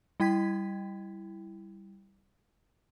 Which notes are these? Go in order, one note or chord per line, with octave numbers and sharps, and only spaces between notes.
G3 E4 G5 G#6 B6